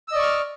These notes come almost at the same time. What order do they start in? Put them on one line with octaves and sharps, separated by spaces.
E6 D#5 D5 C#6 F6